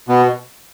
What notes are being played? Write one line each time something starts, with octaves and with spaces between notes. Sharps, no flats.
B2 B3